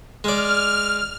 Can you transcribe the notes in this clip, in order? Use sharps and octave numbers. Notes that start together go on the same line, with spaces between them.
G#3 D5 F6